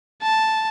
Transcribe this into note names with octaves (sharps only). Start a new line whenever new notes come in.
A5